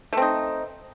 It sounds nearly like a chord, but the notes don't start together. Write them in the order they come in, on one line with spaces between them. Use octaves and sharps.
A3 C4 D#4